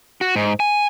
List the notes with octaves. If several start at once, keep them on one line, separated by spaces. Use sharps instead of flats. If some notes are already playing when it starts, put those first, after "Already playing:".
F#4
G#2
G#5